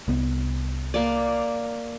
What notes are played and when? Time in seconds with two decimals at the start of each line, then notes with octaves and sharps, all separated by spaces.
0.08 C2 B3
0.94 A#3 D5